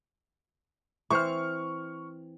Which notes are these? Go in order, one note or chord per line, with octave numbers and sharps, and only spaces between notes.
E3 C4 C5 C#6 F6